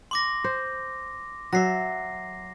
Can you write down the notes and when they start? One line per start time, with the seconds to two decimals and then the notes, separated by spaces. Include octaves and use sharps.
0.11 C6 D6 A#6
0.44 C5
1.53 F#3 E5 A#6 C7